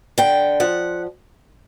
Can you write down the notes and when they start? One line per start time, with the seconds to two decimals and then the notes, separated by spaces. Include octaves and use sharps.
0.18 D3 G5
0.60 F3 F#5